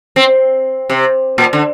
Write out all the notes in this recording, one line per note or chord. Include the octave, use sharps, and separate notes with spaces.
C4
C3
A#2
D3